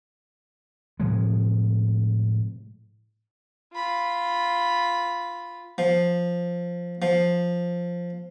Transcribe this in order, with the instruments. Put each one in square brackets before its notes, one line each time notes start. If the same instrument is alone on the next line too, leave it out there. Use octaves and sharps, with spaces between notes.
[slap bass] A2 C3 F3 G#3
[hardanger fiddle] F4 B5
[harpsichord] F3
F3